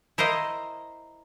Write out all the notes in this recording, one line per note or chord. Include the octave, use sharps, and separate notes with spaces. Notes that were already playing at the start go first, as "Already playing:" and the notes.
E4 A#4 C5 D#5 F5